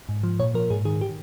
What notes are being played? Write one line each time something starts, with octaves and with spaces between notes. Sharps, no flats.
G#2
F3
A#2 C#5
F3 A#4
G#2 G#4
D#3 G#4
G4